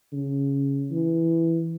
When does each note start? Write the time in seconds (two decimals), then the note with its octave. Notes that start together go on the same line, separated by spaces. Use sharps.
0.12 C#3
0.91 E3